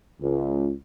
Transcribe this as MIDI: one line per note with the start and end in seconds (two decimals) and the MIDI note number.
0.22 0.72 37